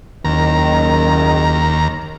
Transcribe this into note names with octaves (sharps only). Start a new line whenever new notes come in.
F#1 D#2 D#3 A#5